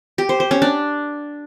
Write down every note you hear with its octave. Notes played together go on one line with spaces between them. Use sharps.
G4
C5
C5
C#4
D4